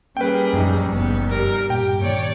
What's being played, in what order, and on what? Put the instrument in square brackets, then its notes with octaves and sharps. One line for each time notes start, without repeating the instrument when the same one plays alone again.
[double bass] G3 C#4 [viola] A#3 G#4 [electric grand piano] B4 G5
[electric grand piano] A#1 D#4 [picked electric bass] F#2
[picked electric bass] F#1 [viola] B3
[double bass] G2 [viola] G3 A#4
[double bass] G2 [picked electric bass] A#2 [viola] G4 [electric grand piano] G5
[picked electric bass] A#2 D#3 [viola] C#5 D5